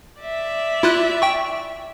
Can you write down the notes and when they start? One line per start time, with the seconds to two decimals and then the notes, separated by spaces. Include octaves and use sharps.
0.21 D5 E5
0.83 E4 F4 F#6
1.22 G5 C#6